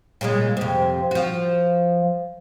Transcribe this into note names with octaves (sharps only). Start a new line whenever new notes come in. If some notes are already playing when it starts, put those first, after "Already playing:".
A#2 C#3 G#3
F2 C3
F3 F#4